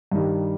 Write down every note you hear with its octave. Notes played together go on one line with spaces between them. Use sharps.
G2 D#3 G3